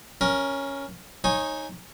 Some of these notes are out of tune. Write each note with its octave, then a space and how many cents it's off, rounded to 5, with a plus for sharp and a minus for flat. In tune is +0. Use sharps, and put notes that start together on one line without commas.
C#4 +0 A#4 +10
D#4 +0 C#5 -20 G#5 +0